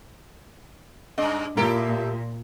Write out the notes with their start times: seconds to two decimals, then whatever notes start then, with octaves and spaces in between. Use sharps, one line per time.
1.18 G2 G#3 D4 D#5
1.57 A#2 E4 G4 A4 A#4